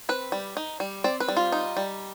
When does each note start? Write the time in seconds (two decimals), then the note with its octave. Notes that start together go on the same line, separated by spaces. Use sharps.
0.09 C4 B4
0.32 G3
0.57 D#4
0.80 G3
1.04 C4 D5
1.20 B4
1.28 G3
1.37 F4
1.52 D#4
1.77 G3